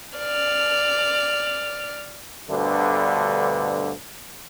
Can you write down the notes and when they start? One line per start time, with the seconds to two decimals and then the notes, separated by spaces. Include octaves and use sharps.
0.18 D5 F6
2.50 D2 G2 B2 D3